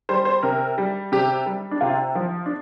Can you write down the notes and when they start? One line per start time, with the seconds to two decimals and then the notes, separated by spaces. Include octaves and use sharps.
0.09 G3 C5
0.25 C5
0.43 C3 A#4
0.78 G3
1.12 C3 G4
1.46 G3
1.71 D4
1.81 C3 F4
2.15 F3
2.46 D4